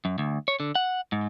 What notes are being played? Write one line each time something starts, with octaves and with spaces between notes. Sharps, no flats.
F#2
D2
C#5
D3
F#5
G#2